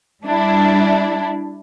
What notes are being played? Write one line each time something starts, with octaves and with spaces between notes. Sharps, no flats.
G3 D4 E4